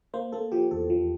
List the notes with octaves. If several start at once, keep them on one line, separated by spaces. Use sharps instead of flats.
A#3 C5
A#3 A4
F3 G4
E2 A4
F3